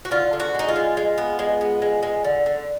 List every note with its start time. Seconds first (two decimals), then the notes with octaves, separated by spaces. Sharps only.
0.05 F#4
0.11 D3 F4
0.33 D3
0.40 F#4
0.54 G#3 D#4
0.69 F4
0.76 G#3
0.97 G#3
1.18 B3
1.39 G#3
1.61 B3
1.82 G#3
2.03 G#3
2.24 D3
2.46 D3